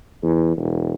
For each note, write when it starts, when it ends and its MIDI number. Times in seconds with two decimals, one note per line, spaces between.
0.23 0.53 40
0.57 0.94 28